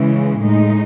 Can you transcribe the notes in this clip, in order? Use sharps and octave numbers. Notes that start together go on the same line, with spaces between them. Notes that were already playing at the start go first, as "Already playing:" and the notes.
Already playing: C#3 E3 G#3
A2 G#3 D#4